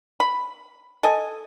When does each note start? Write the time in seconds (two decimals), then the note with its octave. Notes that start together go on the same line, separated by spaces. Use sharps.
0.20 B5
1.03 A4 D#5 G#5